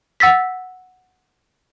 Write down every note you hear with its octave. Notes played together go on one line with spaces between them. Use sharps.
F#5 E6 A6 B6